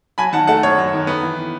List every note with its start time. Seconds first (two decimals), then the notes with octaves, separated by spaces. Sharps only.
0.18 F#3 G#5 B5
0.33 D#3 F#5 A5
0.47 A3 F#5 A5
0.63 F#2 C#5
0.78 F#3
0.93 D#3
1.07 B3
1.23 E3